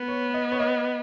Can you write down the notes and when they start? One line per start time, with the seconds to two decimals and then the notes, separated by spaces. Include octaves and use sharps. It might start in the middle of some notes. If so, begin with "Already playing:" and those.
Already playing: B3
0.08 C#5
0.34 D#5
0.52 C#5
0.59 D#5